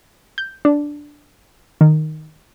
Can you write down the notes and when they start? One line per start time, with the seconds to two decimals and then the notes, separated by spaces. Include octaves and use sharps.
0.38 G6
0.65 D4
1.81 D#3